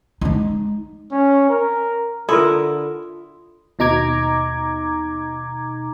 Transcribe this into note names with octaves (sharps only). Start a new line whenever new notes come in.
G#3 D#4
C#4
A#4
D3 E4 F4 A4 A#4 C6 D#6
D#2 B2 D#4 A#5 D6 G#6